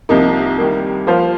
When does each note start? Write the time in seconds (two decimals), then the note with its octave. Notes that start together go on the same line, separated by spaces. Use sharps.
0.09 C2 C3 F3 A#3 D#4
0.58 D#3 G3 A#3
1.06 F3 A#3 F4 C5 F5